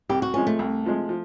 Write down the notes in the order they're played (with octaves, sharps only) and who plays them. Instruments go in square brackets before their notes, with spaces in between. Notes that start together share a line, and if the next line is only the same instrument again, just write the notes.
[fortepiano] C2 [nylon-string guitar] G4
[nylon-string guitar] F#4
[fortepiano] C3 F3 G#3 [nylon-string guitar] C#4
[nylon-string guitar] A3
[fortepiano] C2
C3 F3 G#3
F3